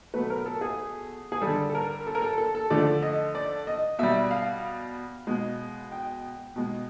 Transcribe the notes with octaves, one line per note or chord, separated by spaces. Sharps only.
B2 F#3 A3 B4
A#4
A4
G#4
G#4
G3 A4
D3
A4
A#4
A4
A#4
A4
A4
A4
D3 F3 A3 D5
D#5
D5
D#5
B2 G3 E5
F5
B2 G#3
G5
B2 G#3